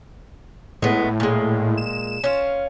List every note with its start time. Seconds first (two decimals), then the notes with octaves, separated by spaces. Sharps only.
0.82 A2 G#3 B3
1.20 A#2 G#3
1.77 E7
2.24 C#4 F4